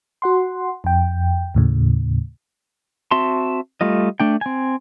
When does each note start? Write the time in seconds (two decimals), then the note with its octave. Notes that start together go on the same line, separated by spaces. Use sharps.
0.22 F#4 F#5 C6
0.84 F2 G5
1.55 D#2 A2 C#3
3.11 C4 F#4 E5 A5 C6
3.81 G3 A3 F4 D#5
4.20 A3 D4 G5
4.41 C4 G#5